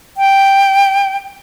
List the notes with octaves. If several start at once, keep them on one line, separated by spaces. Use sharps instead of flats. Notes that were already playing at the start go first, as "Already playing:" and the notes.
G5